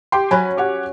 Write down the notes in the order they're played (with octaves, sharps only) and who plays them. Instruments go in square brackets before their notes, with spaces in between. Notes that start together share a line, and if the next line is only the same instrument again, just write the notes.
[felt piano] G4 G5 C6
[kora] F#3 C#4 [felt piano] G#5 B5 F#6
[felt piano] G4 C#5 F#5